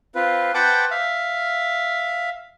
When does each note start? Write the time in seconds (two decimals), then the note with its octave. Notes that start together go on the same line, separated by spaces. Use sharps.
0.15 C4 F4 B4
0.54 B4 C5 F#5 G5 A5 D6
0.91 E5 F5